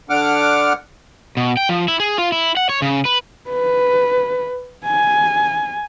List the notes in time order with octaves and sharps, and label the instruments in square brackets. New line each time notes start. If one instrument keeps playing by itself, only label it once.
[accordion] D3 D4 F#5 D6 F6
[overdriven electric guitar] B2
G5
F3
E4
G#4
F4
E4
F#5
C#5
C#3
B4
[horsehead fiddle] B4
G#5